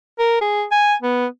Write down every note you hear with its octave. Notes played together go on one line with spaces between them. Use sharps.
A#4
G#4
G#5
B3